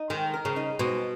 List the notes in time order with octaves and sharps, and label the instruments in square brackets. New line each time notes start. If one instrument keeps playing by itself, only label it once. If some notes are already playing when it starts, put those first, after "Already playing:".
Already playing: [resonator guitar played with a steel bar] D#4
[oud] D#3 [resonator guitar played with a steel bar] G#3
[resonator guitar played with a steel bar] A#4
[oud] C#3
[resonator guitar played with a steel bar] D#4
[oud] B2 [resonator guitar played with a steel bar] G#3